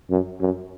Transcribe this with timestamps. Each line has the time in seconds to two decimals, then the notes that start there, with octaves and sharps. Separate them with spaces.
0.10 F#2
0.41 F#2